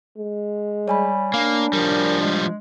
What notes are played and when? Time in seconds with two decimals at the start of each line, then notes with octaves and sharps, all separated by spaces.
0.18 G#3
0.88 G3 C#5 G#5 B5
1.34 A#3 D4 F5
1.73 F3 G3 A#4
2.20 G#3